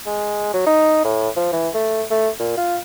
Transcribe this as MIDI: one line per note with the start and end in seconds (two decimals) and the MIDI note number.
0.06 0.50 56
0.54 0.66 54
0.66 1.04 63
1.04 1.29 45
1.36 1.48 53
1.52 1.69 52
1.74 2.02 57
2.11 2.29 57
2.39 2.54 46
2.57 2.78 65